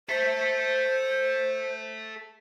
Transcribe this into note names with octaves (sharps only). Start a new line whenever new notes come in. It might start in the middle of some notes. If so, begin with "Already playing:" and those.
A4 C5 E5